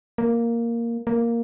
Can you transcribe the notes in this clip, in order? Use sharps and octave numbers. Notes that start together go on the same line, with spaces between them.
A#3
A#3